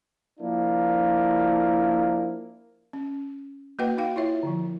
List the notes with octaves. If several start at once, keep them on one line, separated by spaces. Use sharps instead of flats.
F3 A#3 D4 E4
C#4
A#3 F#4 B4 D#5 F#5 G5
D#4 F#4 F5 G5
E4 F4 C#5 E5
D3 F3